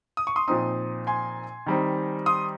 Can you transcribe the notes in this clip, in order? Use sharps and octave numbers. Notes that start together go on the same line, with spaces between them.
D#6
C#6
C6 D#6
A#2 F3 C4 D#4 C6 D#6
G#5 C6
D#3 G3 C4 D#4
C6 D#6